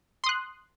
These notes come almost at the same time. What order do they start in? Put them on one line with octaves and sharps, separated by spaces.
C6 D#6 F#6